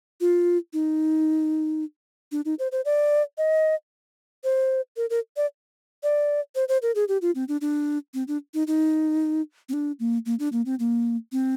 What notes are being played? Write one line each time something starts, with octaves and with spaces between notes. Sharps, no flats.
F4
D#4
D4
D#4
C5
C5
D5
D#5
C5
A#4
A#4
D5
D5
C5
C5
A#4
G#4
G4
F4
C4
D4
D4
C4
D4
D#4
D#4
C4
D4
A#3
A#3
D4
A#3
C4
A#3
C4